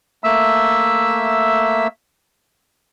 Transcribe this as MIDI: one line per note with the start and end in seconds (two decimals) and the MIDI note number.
0.24 1.87 57
0.24 1.87 58
0.24 1.87 76
0.24 1.87 88